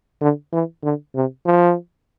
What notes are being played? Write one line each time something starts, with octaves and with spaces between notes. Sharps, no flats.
D3
E3
D3
C3
F3